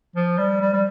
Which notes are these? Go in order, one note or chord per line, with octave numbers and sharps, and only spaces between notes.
F3
G3
G3
G3